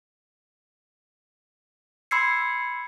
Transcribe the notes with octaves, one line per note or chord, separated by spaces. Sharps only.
B5 C6 E6 G#6 C7 C#7